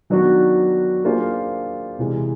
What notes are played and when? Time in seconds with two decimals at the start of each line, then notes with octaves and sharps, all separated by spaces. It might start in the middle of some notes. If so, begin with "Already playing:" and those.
0.10 D#3 F#3 B3 D4 F#4
1.04 A#3 D4 F4 G#4 C5
1.99 C3 E3 G#3